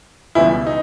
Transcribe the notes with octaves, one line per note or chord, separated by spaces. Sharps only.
C#2 B2 E3 G3 E4
D#4